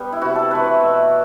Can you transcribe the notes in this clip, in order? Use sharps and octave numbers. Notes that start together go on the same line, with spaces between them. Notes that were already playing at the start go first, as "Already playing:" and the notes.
Already playing: G3 B3 G4
E4
C3 F#4
A4
E3 A3 C4 B4
D5
B2 E5